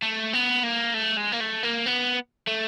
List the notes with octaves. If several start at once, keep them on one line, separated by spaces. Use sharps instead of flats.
A3
B3
A#3
A3
G#3
A#3
A3
A#3
B3
A3